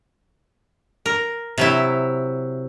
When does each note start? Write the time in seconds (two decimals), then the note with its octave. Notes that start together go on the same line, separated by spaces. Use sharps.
1.06 A#4
1.58 C3 F#3 E4